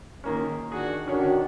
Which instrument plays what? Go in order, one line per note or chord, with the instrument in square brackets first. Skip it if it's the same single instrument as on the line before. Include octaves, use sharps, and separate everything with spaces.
[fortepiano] D#3 A#3 C#4
[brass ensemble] D#3 D4 F#4 [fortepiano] G#4
[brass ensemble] D3 D#3 D4 [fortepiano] C#4 C#5 [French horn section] F#4